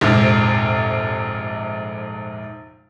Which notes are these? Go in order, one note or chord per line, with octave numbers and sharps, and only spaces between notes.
F1 A#1 G#2 C3